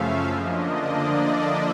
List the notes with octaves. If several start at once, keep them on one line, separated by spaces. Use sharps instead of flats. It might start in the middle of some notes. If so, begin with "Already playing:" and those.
Already playing: F#2 C#3 F3 A3 C#4 E5 F5
D3 F3 A#3 D4 D#5
D5
E5